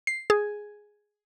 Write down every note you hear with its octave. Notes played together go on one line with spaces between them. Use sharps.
C7
G#4